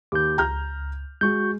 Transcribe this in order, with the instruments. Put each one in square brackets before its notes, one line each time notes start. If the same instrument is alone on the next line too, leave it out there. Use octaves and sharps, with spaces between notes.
[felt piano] D#2 [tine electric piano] D6 G6
[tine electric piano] C#2 [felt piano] A#5 F6 G6
[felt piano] G#3 [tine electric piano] F#4 C#6 G6